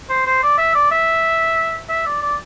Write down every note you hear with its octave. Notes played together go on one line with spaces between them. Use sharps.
C5
C5
D5
E5
D5
E5
E5
D5
D5